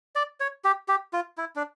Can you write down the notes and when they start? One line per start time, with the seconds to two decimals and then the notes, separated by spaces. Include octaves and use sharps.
0.15 D5
0.40 C#5
0.64 G4
0.88 G4
1.13 F4
1.38 E4
1.56 D4